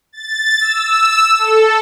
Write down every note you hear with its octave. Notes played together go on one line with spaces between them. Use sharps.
A6
E6
A4